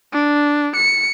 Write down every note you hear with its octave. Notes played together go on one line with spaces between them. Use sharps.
D4
C#7